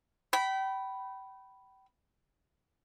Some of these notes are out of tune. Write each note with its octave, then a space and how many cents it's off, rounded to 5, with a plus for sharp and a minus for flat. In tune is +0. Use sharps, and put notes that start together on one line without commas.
G5 -30 B5 +0